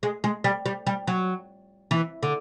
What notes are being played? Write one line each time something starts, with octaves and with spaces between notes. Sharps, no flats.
G#3
G#3
G3
G3
G3
F#3
E3
D3